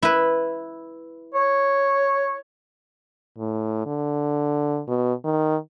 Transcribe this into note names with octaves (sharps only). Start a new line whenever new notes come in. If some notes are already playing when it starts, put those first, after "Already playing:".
E4 B4
C#5
A2
D3
B2
D#3